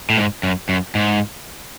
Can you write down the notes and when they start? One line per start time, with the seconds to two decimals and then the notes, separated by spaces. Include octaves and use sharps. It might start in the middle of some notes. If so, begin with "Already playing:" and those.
0.10 A2
0.17 G#2
0.43 F#2
0.69 F#2
0.95 G#2